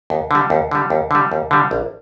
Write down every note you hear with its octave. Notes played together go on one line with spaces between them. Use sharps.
D#2
D3 G3
D#2
D3 G3
D#2
D3 G3
D#2
D3 G3
A#1